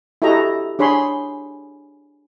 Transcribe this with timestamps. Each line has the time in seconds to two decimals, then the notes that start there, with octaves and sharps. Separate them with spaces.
0.22 E4 F#4 G4 A4 D#5 A#5
0.79 D4 G#4 C#5 B5 C6